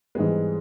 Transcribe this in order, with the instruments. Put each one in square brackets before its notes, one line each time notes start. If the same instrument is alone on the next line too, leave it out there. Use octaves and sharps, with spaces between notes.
[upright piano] G#2 E3 G3 B3 [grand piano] G#3